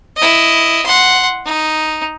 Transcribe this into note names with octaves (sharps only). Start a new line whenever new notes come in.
E4 D#5
F#5 C6
D#4